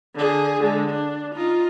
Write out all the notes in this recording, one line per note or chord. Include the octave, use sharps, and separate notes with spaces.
D3 G#4
D3 G#3
D4
D#4 F4